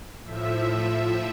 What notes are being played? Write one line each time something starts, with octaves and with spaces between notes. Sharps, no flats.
A2 F3 E5
E5